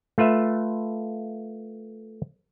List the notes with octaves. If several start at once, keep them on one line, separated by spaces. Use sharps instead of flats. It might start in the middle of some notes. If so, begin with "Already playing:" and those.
A3 F4 B4 E5